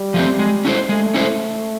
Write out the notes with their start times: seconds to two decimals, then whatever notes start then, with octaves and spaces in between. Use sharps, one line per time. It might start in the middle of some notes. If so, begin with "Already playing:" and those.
Already playing: G3
0.14 F3 A3 C4
0.39 G#3
0.65 C#4 E4 A4 C5
0.89 G#3 A3
1.14 C#4 E4 A4 C5